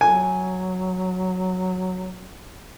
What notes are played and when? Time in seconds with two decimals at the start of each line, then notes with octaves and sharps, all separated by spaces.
0.01 F#3 G#5